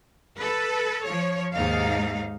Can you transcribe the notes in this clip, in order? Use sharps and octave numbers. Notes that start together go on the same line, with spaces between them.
A4 B4
F3 C#5
D#2 G#2 D#4 F5